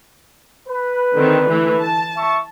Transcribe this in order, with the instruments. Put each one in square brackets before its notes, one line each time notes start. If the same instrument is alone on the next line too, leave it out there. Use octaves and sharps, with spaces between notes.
[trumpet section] B4
[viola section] D3 D#3 C4
E3 A3
A5
[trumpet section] E5 C#6